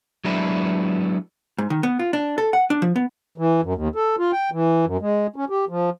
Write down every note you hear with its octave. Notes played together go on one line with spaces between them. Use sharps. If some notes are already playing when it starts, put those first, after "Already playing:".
F#3 G#3 B3 D4 E4
G#2
D#3
B3
F4
D4
A4
F#5
D4
F3
B3
E3
F#2
D#2
A4
F4
G5
E3
F#2
G#3
C#4
G4
F3